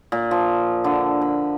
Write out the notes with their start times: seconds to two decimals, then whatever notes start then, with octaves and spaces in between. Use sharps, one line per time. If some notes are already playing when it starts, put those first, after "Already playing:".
0.12 A#2
0.31 F3
0.84 D3
1.22 B5